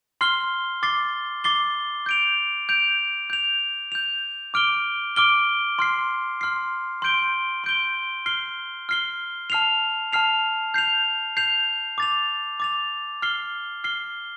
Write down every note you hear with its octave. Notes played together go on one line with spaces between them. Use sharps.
C6 F6 C7 G7
D6 A6 C7 G7
D6 A6 C7 G7
G6 D7 F7
G6 D7 F7
G6 F7
G6 F7
D6 F6 D7 G7
D6 F6 D7 G7
C6 F6 C7
C6 F6 C7
C6 G6 D7 G7
C6 G6 D7 G7
F6 C7 G7
F6 C7 G7
A5 F6 C7 F7
A5 F6 C7 F7
G6 C7 F7
G6 C7 F7
D6 A6 F7
D6 A6 F7
F6 C7 G7
F6 C7 G7